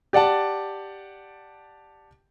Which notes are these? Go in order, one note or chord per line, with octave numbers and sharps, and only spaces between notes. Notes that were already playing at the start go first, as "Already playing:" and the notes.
G4 D5 F#5 A5